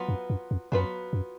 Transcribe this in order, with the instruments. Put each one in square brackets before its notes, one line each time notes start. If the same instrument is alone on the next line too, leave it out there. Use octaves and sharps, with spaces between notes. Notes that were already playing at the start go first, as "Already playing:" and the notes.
Already playing: [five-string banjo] F#3 B3 F4 B4
[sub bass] F#2
F#2
F2
[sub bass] F#2 [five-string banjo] F#3 B3 F4 B4
[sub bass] F#2